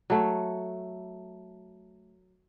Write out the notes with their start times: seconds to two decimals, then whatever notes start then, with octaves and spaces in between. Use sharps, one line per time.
0.10 F#3 A3